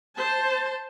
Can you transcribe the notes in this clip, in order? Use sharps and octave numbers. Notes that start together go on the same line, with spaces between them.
C5 A5